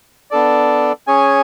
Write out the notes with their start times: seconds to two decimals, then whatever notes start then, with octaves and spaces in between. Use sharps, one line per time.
0.31 B3 D4 A4 D5
1.07 C#4 G#4 C#5 G#5